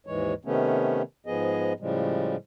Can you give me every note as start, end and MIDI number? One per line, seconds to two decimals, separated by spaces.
0.06 0.34 39
0.06 0.34 44
0.06 0.34 52
0.06 0.34 56
0.06 0.34 73
0.45 1.02 48
0.45 1.02 51
0.45 1.02 57
0.45 1.02 59
0.45 1.02 61
1.26 1.73 44
1.26 1.73 53
1.26 1.73 59
1.26 1.73 68
1.26 1.73 75
1.80 2.36 45
1.80 2.36 49
1.80 2.36 53
1.80 2.36 55
1.80 2.36 56